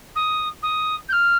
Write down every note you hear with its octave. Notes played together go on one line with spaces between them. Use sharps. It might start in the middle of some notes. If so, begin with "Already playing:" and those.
D#6
D#6
G6
F6